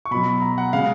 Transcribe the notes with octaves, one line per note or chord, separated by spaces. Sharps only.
C#6
B2 F#3 B5
A#5
F#5
C#3 G#3 F5